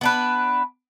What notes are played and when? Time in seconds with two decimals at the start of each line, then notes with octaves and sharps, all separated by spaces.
0.01 B3 D4 B4